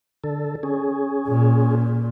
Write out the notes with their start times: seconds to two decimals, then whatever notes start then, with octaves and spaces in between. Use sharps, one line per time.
0.24 D3 A4
0.63 C#4 G#4
1.27 A#2